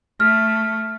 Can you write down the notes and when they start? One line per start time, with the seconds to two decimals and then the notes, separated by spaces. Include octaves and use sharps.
0.20 A3 F6